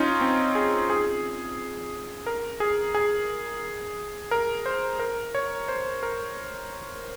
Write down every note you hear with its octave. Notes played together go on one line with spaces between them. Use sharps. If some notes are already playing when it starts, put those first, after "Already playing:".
Already playing: C#4 D#4 F4
C4
G#4
G#4
A#4
G#4
G#4
A#4
C5
A#4
C#5
C5
A#4